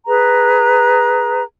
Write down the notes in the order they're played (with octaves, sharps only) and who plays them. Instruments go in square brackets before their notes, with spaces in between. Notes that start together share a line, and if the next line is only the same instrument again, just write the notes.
[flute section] G#4 B4 A#5